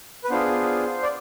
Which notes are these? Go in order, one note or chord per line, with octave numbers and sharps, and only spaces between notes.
B4
B3 D4 F4 G#4 C5
D5